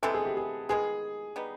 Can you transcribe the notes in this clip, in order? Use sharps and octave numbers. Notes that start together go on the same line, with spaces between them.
C3 E3 G#3 B3 A4
G#4
G4
G#4
D#3 G#3 B3 G#4
G3 B3 D#4